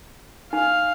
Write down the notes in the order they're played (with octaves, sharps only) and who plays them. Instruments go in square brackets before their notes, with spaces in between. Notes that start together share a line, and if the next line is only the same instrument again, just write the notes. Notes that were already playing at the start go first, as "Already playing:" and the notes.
[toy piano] D#4 G#5 [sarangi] F5